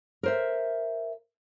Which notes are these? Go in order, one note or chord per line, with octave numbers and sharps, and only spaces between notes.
A#4 C5 E5